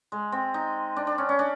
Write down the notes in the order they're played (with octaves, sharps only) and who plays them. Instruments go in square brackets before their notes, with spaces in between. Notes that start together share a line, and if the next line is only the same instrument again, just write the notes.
[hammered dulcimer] G#3
C4
D#4
D4
D4
C#4
C#4
D4